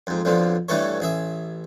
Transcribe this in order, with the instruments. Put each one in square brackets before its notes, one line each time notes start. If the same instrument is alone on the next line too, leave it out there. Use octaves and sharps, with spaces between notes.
[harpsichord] F2 G#2
B1 F2 D3 F3
G2 E3 A3 A4 C#5
A1 G#4 E5